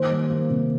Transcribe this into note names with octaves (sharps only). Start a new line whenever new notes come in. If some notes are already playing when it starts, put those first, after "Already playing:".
Already playing: D#3 A#3 C5
G3
A#3
C3